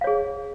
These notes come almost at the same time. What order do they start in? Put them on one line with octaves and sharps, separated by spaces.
F5 C#5 G#4